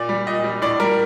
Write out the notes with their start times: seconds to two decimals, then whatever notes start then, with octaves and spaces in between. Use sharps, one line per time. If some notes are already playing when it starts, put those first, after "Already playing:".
Already playing: A#2 D5
0.09 G3
0.27 A#2 D#5
0.44 G3
0.62 A2 D5
0.80 G3 A#4